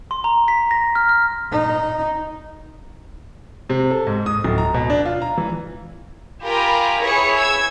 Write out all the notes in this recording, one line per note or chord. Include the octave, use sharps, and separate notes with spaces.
C6
A#5
B6
A#6
F6
F6
D#4
C3
A4
G#2
D#6
D1
A#5
B2
D4
F4
A#5
E3
F4 G4 A#4 G#5 A#5 B5
E4 G#4 B4 C#5 C#7
E6 G#6